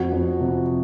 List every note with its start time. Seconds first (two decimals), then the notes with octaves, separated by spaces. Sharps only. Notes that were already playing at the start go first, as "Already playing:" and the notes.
Already playing: F2 F#4
0.13 F2
0.41 C3